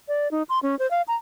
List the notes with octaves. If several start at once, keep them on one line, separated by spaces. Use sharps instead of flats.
D5
D#4
C6
C#4
C5
F5
A#5